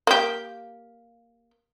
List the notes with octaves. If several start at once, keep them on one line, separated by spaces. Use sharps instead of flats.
A#3 G4